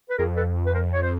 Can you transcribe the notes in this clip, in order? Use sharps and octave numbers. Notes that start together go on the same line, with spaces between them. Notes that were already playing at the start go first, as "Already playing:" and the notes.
B4
F2 G#4 A#4
A4 B4
B4
A#4 C5
C#5
C5